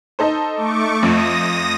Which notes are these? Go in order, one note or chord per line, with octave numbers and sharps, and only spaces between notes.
D#4 A4 C5
A3 C#6 D6
F2 D#6 A#6